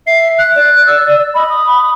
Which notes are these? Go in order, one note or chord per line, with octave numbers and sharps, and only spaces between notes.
E5 C7
F#6
D5
E6
D#5 B5
D#6